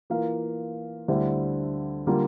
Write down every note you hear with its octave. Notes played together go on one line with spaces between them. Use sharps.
E3 A#3 F4 A#4 F5
D2 D3 G3 C4 E4
D3 G3 A#3 F4